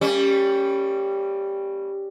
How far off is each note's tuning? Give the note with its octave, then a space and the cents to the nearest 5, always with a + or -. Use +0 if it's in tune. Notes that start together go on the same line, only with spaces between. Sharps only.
G3 +5 A#3 -35 C#4 +0